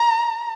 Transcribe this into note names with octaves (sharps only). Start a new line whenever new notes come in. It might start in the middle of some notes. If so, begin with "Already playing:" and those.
Already playing: A#5